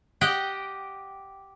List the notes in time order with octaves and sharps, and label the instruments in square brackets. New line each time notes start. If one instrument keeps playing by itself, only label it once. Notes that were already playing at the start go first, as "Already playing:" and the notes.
[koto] G4 D#5 F#5 G5